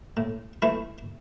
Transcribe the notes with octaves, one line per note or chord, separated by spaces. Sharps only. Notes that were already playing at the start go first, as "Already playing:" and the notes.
A2
E3 A3 E4